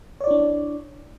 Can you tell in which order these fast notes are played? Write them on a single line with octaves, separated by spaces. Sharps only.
C#5 D5 E4 D4